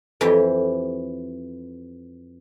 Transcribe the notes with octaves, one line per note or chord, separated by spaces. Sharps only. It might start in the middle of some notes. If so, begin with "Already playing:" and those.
F2 E3 C4 G4